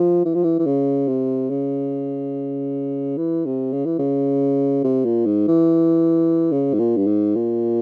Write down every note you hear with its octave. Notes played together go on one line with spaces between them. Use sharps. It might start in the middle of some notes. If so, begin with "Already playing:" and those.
Already playing: F3
E3
F3
E3
E3
C#3
C3
C#3
E3
C3
C#3
E3
C#3
C3
A#2
G#2
E3
C#3
G#2
A#2
G2
G#2
A#2